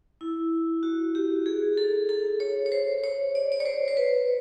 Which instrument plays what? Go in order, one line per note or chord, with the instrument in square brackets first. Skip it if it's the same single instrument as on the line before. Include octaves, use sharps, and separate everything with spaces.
[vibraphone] E4
F#4
G4
G#4
A4
A4
C#5
C#5
C5
C#5
D5
D5
C#5
C5
C5
B4